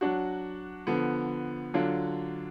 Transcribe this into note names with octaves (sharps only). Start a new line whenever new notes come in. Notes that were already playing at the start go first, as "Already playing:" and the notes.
F#3 D4 F#4
D3 F3 B3
D3 F#3 D4 F4